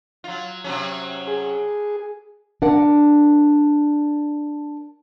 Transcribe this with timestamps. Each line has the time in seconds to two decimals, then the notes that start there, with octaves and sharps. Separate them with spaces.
0.24 F#3 F4
0.64 C3 F#3 C#4
1.27 G#4
2.62 D4 A#4 F#5